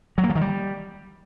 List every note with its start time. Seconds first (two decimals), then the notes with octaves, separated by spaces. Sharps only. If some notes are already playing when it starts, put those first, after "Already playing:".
0.18 F#3
0.24 A#3
0.30 F3
0.35 D#3
0.41 G3